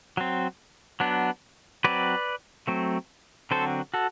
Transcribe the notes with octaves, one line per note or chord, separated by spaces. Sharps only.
F#3 C4
F#3 B3 D4
F#3 C4 B4 D5
F#3 A3 C4
D3 F#3 C4 A4 C5
F#4 A4